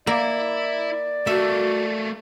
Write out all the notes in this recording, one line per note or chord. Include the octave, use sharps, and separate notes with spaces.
A#3 E4 D5 E5
A3 A#3 F#4 E5